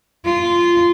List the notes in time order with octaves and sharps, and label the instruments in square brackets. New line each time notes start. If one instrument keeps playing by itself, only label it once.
[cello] F4